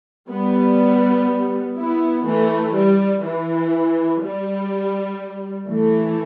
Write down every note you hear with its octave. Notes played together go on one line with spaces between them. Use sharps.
G3 B3
B3 E4
E3 A3
G3
E3
G3
E3 A3